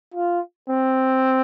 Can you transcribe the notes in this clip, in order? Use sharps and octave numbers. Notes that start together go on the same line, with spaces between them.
F4
C4